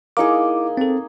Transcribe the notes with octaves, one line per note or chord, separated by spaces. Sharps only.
A#3 D#4 E4 G#4 D6
C4 A4